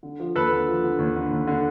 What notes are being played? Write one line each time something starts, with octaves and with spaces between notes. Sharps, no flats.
D3
F3
D#2 A4 B4
D3
F3
D3
D#2
D3
D#2
D3